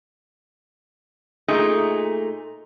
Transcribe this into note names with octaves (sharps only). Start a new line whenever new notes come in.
A#2 A3 D#4 G#4